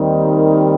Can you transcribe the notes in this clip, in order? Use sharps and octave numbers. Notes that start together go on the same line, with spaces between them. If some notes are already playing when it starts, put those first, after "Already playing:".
Already playing: D#2 D#3 G3 C4 D#4
A#4